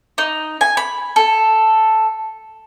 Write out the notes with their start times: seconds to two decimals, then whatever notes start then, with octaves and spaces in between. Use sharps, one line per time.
0.18 D#4
0.61 G#5
0.77 B5
1.16 A4